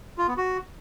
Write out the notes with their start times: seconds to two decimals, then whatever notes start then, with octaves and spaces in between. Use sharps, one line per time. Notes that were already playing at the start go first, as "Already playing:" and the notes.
0.18 F4
0.28 B3
0.37 F#4